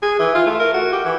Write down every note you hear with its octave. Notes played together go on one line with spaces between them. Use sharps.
G#4
E3
F4
A3
A#4
F#4
G4
E3